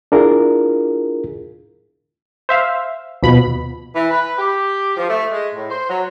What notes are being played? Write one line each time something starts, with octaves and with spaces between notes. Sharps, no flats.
D4 E4 F4 G#4 A#4
C5 E5 F5
D#2 B2 F3 B5
E3
B4
G4
F3
A3
G#3
A2
C5
F#3